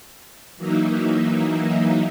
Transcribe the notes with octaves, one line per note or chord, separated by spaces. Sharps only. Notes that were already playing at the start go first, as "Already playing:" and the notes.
E3 F#3 A#3 D#4 E4